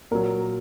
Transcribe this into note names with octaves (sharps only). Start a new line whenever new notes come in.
A#2 F#3 A#4